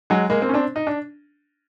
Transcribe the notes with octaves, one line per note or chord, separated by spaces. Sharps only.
F#3 G#3
G#3 A#3
A#3 C4
C#4
C4 D4
D#4
D4